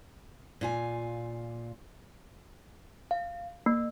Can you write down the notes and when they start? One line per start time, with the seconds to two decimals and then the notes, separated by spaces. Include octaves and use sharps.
0.61 A#2 F4 G#5
3.11 F5
3.66 A#3